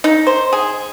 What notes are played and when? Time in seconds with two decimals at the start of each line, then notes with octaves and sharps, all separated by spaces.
0.04 D#4
0.27 C5
0.53 G#4